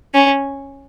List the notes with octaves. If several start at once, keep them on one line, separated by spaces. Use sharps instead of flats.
C#4